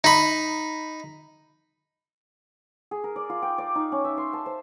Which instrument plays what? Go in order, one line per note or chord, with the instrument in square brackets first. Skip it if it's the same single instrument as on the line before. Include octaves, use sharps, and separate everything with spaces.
[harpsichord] D#4 B5
[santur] G#4
A#4
D5
F4
G5
D5
D#4
C#4
E5
C6
A5
C5